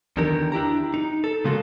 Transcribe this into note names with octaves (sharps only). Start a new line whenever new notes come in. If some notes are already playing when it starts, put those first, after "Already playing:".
E2 D3 D#3 G4 A#4
D4 E4 G4 A#5
D#4
A4
C#3 G#3 A#3 F4 F#4 A4